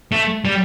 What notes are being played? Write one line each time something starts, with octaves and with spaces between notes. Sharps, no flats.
A3
G3